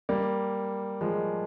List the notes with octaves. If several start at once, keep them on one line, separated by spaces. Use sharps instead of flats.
G3 A#3
F3 G#3